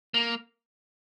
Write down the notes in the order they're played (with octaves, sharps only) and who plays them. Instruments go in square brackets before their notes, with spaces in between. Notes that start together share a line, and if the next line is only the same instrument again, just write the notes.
[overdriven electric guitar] A#3